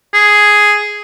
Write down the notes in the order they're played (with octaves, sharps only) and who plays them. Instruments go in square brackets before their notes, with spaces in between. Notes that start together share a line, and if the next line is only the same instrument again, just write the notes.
[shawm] G#4